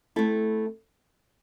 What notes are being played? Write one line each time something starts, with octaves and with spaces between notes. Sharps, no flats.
A3 C4 E4 A4